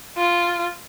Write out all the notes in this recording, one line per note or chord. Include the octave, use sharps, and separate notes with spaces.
F4